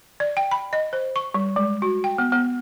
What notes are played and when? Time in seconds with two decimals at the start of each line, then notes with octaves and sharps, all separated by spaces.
0.20 D5
0.37 G5
0.51 B5
0.73 D#5
0.93 C5
1.16 C#6
1.34 G3
1.56 G#3
1.82 F#4
2.04 G5
2.18 B3
2.32 B3